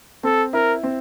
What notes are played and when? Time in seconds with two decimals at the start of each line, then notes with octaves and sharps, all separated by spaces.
0.24 C4 A4
0.53 E4 A#4
0.83 C4